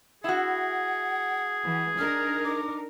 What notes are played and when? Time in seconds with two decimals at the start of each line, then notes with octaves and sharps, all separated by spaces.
0.24 E4 F#4 G#4 F#5
1.64 E3
1.98 D4 D#4 A#4 F6
2.44 D6